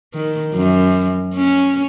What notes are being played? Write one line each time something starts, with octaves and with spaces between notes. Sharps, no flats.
D#3
F#2
C#4